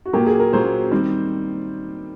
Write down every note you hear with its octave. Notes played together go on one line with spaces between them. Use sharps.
F#4
A#2 F#3 A#3 G4
G#4
A#4
A#2 F#3 A#3 C5
D#3 G3 C4